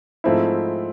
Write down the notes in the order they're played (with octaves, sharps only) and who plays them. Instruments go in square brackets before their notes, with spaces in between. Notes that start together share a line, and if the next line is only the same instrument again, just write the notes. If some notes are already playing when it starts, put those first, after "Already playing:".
[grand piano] G#2 F3 A3 C4 E4